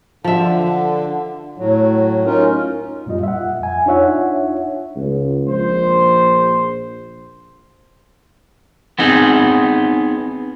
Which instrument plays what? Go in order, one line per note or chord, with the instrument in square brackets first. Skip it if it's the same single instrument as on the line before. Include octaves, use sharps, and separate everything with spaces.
[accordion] D3 [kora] F3 E5
[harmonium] A2 F#3
C#4 D#4 F4 A#4
[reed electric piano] F#2 A#2 G3 F4 D#5
E5 F#5
F2 G#5
D4 D#4 F4 C#5 E5 F#5
[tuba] C#2
[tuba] A#1 [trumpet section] C5
[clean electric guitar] B3 C4 D#4 G#4